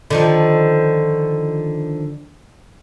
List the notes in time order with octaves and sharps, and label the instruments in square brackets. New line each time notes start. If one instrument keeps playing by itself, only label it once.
[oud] D3 D#3 F3